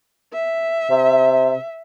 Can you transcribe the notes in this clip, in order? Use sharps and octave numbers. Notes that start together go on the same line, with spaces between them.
E5
C3